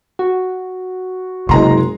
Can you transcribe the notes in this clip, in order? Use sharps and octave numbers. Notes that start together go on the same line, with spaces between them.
F#4
F#1 C3 G#3 A#5 C6